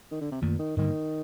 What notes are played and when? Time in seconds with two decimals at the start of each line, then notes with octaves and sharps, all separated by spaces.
0.11 D#3
0.21 D3
0.32 C3
0.41 F#2 A#2 D#3 A3
0.59 D#3
0.77 G2 D3 D#3 G3 A#3